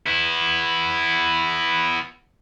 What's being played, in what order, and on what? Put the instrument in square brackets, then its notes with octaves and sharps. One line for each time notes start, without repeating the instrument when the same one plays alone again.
[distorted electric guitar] B3 E4